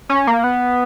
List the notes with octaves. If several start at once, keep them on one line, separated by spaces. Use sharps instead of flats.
C#4
A#3
B3